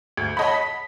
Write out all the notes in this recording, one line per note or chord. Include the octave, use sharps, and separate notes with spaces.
D2
C#5 D#5 F#5 A5 B5
B6